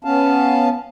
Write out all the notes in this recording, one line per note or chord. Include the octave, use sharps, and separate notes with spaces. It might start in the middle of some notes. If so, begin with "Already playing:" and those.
B3 C#4 F5 A5